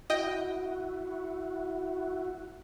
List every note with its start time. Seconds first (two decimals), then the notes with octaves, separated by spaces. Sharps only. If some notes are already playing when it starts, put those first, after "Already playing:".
0.10 E4 F#4 D#5 G5